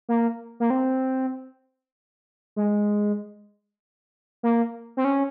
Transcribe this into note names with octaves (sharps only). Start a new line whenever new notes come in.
A#3
A#3
C4
G#3
A#3
C4
C#4